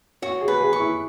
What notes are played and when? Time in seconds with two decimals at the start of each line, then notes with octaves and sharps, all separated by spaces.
0.22 F#4 C#5
0.41 G#4
0.48 B4
0.61 G#4
0.73 C#6
0.79 E4